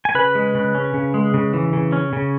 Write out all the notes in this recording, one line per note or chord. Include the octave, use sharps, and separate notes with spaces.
G#5
C#3 B4 B5
G#3
C#3
C#4
C#3
G#3
C#3
E3
C#3
C#4
C#3